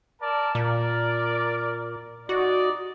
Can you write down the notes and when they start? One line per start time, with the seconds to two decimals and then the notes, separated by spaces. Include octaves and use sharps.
0.21 A#4 D5 A5
0.55 A#2 A#4 D5
2.29 D#4 F#4 D5 D#5